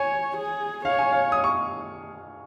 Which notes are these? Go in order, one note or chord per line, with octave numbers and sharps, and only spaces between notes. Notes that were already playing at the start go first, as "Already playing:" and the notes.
Already playing: C#5 G#5
G#4
C#5 F5
G#5
F5
D#6
C#6